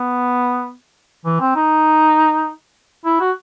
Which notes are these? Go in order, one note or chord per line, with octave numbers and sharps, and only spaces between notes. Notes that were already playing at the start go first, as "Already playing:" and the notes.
Already playing: B3
E3
C4
D#4
E4
F#4